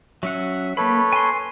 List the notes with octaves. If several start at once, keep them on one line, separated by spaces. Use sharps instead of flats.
F#3 C#4 E5 F#5
A#3 A4 B4 C#5 B5
G#5 C6